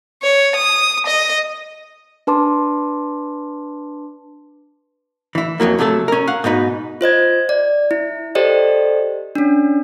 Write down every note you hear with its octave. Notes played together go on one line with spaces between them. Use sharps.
C#5
D#6
D#5
D4 B4 A5 C6 D6
E3 E4
F2 G#2 F#3 A#3
C3 F#3 A3 A4
C#4 A#4
F5 F#5
G#2 B2 D#4 B4
F4 C5 D#5 G#6
D5
E4
G4 A4 C5 D5 D#5
C#4 D4